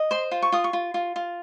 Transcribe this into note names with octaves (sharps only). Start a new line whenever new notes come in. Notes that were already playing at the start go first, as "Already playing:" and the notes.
Already playing: D#5
C5 C6
F4
C#6
F4 D#6
C#6
F4
F4
F4